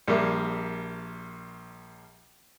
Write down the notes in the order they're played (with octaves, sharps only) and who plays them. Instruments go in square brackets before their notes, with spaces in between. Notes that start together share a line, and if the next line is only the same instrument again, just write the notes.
[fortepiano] A#1 G3 A#3 E5